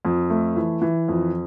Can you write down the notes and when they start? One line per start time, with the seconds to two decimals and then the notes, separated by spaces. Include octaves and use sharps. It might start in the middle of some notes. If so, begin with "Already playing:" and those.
0.05 F2
0.30 A3
0.56 E3
0.82 E3
1.08 F2